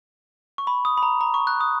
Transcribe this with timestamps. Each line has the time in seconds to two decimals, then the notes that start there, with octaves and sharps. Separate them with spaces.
0.58 C#6
0.67 B5
0.85 D#6
0.97 B5
1.03 A#5
1.21 A#5
1.34 C#6
1.47 F#6
1.61 D#6